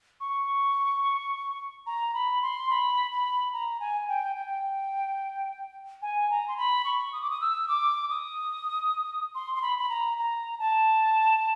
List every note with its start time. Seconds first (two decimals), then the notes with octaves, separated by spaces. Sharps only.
0.20 C#6
1.86 A#5
2.14 B5
2.42 C6
2.70 B5
3.12 B5
3.53 A#5
3.80 G#5
4.08 G5
4.36 G5
6.02 G#5
6.30 A#5
6.48 C6
6.58 B5
6.85 C#6
7.13 D#6
7.22 D6
7.30 D#6
7.41 E6
7.68 D6
8.10 D#6
9.35 C6
9.55 C6
9.62 B5
9.79 B5
9.89 A#5
10.18 A#5
10.59 A5